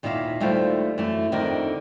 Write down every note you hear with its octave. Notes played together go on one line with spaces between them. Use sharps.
D#2 A#2 B3 E4 E5 F5
D#2 G3 A3 E4 F4 C5
F#2 E3 A3
F2 D3 D#3 D#4 G4 A#4